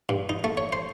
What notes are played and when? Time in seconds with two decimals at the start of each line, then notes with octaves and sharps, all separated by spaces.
0.09 G2
0.29 D#4
0.44 A3
0.57 C#5
0.73 C5